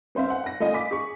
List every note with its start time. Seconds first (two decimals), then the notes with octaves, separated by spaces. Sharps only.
0.15 B3 C4 C5 E5 F5
0.30 F#5
0.44 F#5 A#6
0.60 A3 F4 D#5 F5 G#5
0.74 D6 B6
0.91 G#4 C#6